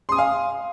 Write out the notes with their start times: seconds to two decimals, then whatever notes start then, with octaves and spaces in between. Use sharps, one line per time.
0.09 C6
0.12 D#6
0.15 G#5
0.18 F5